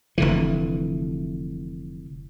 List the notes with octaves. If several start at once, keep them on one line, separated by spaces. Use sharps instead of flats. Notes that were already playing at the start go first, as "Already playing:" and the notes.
F1 D3 E3